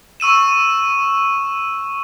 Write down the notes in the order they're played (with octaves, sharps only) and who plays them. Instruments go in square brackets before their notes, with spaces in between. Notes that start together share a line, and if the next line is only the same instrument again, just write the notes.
[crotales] C#6 E6 D#7 E7